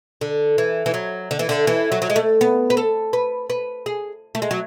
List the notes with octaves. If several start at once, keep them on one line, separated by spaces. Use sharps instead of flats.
D3
E3
E3
F#3
D3
E3
D3
E3
F#3
F#3
G#3
A3
B3
B4
A4
B4
B4
G#4
A3
G#3
F#3